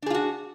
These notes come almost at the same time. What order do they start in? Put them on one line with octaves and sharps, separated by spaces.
D4 G#4 F4 F#4